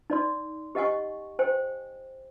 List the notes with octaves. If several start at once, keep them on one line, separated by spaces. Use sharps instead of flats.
D#4 D5 C6
G4 D#5 F#5 G#5 C#6
C5 G5 G#5